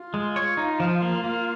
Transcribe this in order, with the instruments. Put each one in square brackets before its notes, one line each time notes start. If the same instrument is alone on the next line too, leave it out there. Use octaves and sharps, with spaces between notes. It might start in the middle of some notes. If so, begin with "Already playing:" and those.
Already playing: [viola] F4
[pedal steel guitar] G#3
C#5
D#4
F3
A#3
A#3